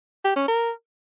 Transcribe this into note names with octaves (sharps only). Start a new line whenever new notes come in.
G4
C#4
A#4